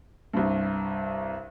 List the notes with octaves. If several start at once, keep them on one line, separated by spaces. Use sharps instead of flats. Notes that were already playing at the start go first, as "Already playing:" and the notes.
C2 G2